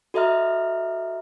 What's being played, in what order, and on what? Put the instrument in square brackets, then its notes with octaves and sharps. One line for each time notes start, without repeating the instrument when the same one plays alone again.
[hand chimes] F#4 A4 D#5 E5 A#5 F6